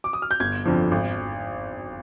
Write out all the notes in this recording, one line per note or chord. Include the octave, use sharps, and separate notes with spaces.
D6
D#6
F6
G6
G1 G#6
F2 D3 F3
G#1